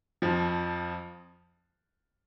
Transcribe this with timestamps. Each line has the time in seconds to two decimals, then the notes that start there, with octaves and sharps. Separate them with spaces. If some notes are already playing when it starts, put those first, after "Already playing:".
0.22 F2 F3